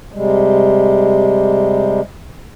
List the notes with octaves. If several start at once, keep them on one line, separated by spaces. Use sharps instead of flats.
C3 G3 G#3